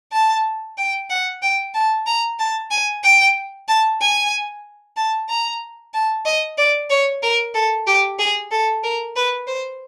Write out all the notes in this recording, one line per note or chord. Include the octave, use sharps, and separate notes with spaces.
A5
G5
F#5
G5
A5
A#5
A5
G#5
G5
A5
G#5
A5
A#5
A5
D#5
D5
C#5
A#4
A4
G4
G#4
A4
A#4
B4
C5